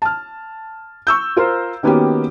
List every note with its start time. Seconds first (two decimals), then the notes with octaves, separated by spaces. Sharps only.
0.02 A5 F6
1.07 C#6 E6 G6
1.36 F4 A#4 C5
1.83 D#3 A#3 B3 C#4 F#4 G4